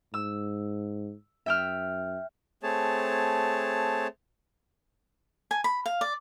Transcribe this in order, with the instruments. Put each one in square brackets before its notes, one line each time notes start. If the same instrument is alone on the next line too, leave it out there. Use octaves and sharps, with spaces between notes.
[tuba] G#2 [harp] E6
[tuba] F#2 [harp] E5 G5 F6
[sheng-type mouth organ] A3 C4 G#4 C#5 A5
[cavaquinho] G#5
B5
F5
D5